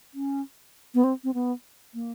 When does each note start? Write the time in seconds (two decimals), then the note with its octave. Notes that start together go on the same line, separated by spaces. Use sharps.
0.14 C#4
0.94 B3
1.04 C4
1.24 C4
1.34 B3
1.94 A#3